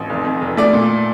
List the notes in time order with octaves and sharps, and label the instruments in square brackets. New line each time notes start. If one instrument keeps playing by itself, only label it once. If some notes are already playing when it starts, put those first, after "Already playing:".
Already playing: [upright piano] A1
F1
F2
F1
A3 D5
A#2